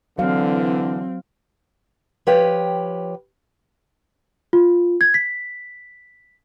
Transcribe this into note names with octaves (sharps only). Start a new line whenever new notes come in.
D3 E3 F#3 C4 F5
F3 G4 B4 C#5 G5
F4
G#6
B6